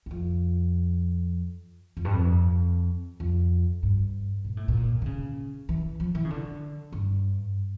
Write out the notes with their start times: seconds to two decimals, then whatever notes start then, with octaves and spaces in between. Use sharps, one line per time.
0.06 E2
0.11 F2
1.97 F2
2.05 G2
2.14 F2
3.20 F2
3.83 G2
4.44 A#2
4.57 A2
4.68 A#2
5.02 D3
5.06 C#3
5.69 E3
6.00 F3
6.15 E3
6.25 C#3
6.30 D3
6.93 G2